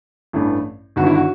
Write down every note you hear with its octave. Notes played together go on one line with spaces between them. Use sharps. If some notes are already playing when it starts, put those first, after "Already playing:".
A1 G2 E3 A3
G1 G2 D#3 F#4
E4
F#4